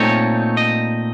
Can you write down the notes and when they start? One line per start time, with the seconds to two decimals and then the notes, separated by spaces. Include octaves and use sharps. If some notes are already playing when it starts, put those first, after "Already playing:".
Already playing: A#2 A3 C4 D#4 C#5
0.57 D#5